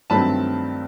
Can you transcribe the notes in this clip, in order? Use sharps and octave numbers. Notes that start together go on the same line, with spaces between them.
G2 D#3 F#3 A3 C4 A5 B5